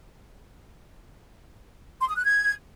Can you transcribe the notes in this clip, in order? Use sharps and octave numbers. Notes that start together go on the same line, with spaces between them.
C6
D#6
F#6
G#6